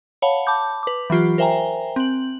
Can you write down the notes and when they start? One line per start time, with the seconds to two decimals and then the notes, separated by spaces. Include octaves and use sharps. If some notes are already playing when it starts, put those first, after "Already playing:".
0.22 C#5 F5 F#5 A5 B5
0.47 A5 B5 D6 G6
0.83 B4 D6
1.10 E3 F#3 F4 G4
1.38 A#4 C5 E5 G5 G#5 A#5
1.96 C4 F#7